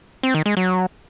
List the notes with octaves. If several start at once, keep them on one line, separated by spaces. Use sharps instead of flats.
C4
D#3
G#3
F#3